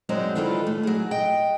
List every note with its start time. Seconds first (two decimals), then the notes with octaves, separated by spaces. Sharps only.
0.09 F#2 F#3 G#3 C4 D4 D#4
0.35 D#3 E3 D4 F4 A4 B4
0.67 A3
0.83 F#3 G#4
1.11 D#5 G5